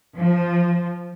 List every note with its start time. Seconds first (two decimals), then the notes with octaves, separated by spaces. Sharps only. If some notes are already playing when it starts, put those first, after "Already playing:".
0.16 F3